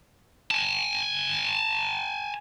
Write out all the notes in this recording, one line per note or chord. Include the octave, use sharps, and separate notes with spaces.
G#5 A5